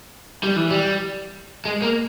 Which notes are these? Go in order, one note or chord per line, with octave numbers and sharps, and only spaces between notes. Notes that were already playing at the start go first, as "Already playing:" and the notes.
G3
E3
G3
G#3
A#3